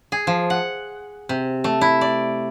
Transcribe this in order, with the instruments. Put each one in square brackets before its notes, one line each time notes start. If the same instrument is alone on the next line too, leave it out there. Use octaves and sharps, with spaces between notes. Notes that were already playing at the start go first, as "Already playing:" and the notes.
[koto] G#4
F3
F#5
C3
A3
E4
D5